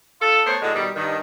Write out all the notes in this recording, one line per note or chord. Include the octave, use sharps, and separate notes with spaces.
D4 F4 A4
A3 B3 A#4 C5 C#5
A2 D3 F#3 G#3
B2 D#3 G3
G2 D#3